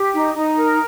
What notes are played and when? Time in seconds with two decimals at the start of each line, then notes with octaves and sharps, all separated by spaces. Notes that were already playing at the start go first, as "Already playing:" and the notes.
Already playing: G4
0.12 D#4
0.35 D#4
0.57 A#4